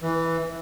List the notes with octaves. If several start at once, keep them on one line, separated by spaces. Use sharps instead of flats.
E3